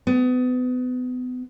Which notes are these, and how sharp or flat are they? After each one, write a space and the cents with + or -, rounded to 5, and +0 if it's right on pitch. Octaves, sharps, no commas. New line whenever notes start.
B3 +30